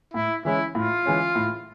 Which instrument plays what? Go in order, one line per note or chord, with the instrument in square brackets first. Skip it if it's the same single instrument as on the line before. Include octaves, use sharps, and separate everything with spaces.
[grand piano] A2 [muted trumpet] E4
[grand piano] E3 G#3 C#4 [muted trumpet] E4
[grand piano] A2 [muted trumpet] F4
[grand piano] E3 G#3 C#4
A2